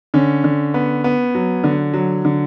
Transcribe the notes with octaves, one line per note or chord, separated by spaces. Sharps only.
D3 C#4
D3
B3
B3
F#3
D3
F#3
D3